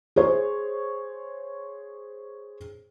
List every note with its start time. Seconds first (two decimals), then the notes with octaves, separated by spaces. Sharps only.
0.16 G#4 C5 C#5